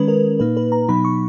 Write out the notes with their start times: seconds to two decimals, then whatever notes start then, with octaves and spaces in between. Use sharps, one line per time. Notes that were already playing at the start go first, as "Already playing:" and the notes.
Already playing: D#3 G#3 C#4 B4
0.08 A#4
0.40 A#2 A#3 D#4 B4
0.57 B4
0.72 A#5
0.88 B2 F#3 B3 D#4 B5
1.05 C#6